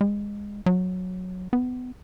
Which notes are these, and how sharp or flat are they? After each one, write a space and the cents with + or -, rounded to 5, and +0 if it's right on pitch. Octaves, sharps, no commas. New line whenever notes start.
G#3 -20
F#3 -10
B3 +25